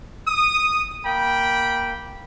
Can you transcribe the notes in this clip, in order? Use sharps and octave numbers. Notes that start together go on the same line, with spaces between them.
D#6
A#3 G5 B5